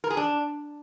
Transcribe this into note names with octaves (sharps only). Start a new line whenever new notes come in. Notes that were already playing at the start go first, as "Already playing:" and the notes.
A#4
G#4
D4